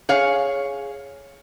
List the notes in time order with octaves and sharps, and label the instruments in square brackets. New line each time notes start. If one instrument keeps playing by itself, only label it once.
[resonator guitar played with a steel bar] G#4 C#5 F5